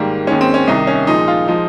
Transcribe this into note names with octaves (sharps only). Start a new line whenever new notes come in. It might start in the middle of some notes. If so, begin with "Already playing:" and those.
Already playing: G#2 D#3 G3 A#3
D#2 D#3 G#3 C#4
C4
C#4
C2 C3 D#3 D#4
C#4
A#2 F3 G#3 D#4
F4
F3 G#3 D#4